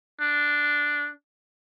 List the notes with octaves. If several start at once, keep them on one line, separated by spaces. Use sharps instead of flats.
D4